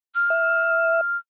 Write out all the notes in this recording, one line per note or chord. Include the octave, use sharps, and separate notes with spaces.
F6
E5